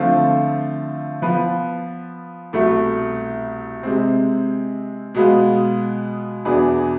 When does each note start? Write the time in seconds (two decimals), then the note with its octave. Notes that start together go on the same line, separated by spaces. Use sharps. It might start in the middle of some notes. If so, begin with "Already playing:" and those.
Already playing: D3 F3 A3 C4 F4
1.22 F3 B3 F4 B4
2.53 C2 B2 A3 E4
3.83 C3 G#3 C4
5.15 B2 G#3 B3 F4
6.45 E2 B2 B3 D4 G#4